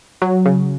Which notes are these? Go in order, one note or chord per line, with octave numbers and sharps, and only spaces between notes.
F#3
C#3